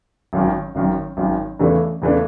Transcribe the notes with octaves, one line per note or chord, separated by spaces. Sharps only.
G#1 F#2 D#3
G#1 F#2 D#3
G#1 F#2 D#3
E2 C#3 E3 A3 D4
E2 C#3 E3 A3 D4